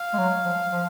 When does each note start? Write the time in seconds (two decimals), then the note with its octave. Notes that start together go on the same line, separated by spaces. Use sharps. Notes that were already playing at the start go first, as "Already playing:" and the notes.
Already playing: F5
0.14 G#3
0.18 F#3
0.45 F3
0.72 F3